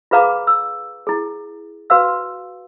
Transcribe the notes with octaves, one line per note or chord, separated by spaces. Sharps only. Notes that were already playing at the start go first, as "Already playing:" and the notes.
F4 G#4 B4 F5 A#5 D6
E6
E4 G#4
F#4 B4 F5 E6